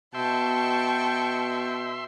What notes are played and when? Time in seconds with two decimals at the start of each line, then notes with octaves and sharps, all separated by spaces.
0.15 B2 E5 G5 A5 C6 C#6